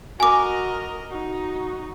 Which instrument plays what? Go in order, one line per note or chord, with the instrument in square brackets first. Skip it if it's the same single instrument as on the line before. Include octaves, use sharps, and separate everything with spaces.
[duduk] F#4 [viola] A#4 D#5 [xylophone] G#5 D6
[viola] D#4 [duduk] F#4